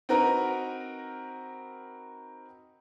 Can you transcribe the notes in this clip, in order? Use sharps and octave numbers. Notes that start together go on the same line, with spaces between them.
C4 D#4 F#4 A#4 B4 A#5